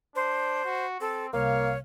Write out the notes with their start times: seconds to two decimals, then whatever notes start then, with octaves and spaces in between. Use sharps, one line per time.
0.16 D4 C5
0.65 F#4
1.01 C4 A4
1.33 C2 A#3 C#5 F5